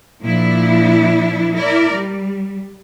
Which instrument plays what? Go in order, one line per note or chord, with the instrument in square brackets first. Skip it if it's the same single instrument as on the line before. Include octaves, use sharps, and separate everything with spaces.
[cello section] A#2 F3 D4 E4
E4 A#4 D5
G3